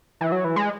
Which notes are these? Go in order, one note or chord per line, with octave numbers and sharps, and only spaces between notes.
E3
F#3
E3
G#3